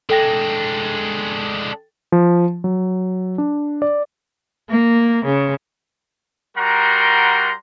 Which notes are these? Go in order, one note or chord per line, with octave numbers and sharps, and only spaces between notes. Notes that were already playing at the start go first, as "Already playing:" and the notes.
G#3 D4 A4 G5 A#6
F3
F#3
D4
D5
A#3
C#3
G3 F#4 A#4 F#5 A#5 C6